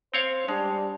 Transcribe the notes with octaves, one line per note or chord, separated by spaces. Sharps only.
C4 C5 C#5 F5
G3 G#3 D4